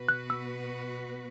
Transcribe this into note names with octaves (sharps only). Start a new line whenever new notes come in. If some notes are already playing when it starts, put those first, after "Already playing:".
Already playing: B2 B3 F#4 B4
F#6
E6